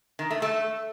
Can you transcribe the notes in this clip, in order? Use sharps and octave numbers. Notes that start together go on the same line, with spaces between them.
D#3
A3
A3